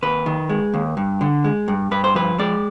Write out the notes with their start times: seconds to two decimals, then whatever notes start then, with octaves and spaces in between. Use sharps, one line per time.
0.02 D#2 B4
0.26 D#3
0.49 G#3
0.74 D#2
0.97 G2
1.21 D3
1.44 G#3
1.68 G2
1.91 G2 B4
2.04 C5
2.15 F3 B4
2.39 G#3 D5